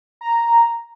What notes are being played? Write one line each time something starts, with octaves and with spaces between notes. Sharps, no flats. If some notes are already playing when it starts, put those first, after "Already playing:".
A#5